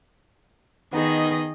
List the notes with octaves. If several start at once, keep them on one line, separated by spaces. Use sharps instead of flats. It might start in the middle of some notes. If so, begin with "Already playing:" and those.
D#3 B3 D#4 G#4 D#5